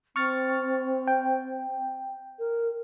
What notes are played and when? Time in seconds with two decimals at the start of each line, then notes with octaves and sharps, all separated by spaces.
0.16 C4 C#6 F6 A6
1.07 G5
2.39 A#4